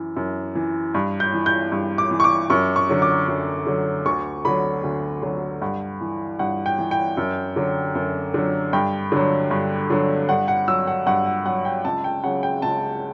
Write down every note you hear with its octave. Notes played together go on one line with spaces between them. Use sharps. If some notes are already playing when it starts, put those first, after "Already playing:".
Already playing: F#2 E3
F#2
E3
G2
G6
E3
G6
G2
D6
E3
C#6
D6
F#2 C#6
C#6
D3 F#3
D6
F#2
D3 F#3
D2 C#6
D3 F#3 B5
D2
D3 F#3
G2 F#5
E3
G2 F#5
G5
E3
G5
F#2
D3 F#3
F#2
D3 F#3
G2 G5
D3 F#3
G2
D3 F#3
G2 F#5
F#5
F#3 E6
F#5
G2 F#5
F#5
F#3 F#5
G5
C#2 A5
G5
C#3 F#3 F#5
G5
C#2 A5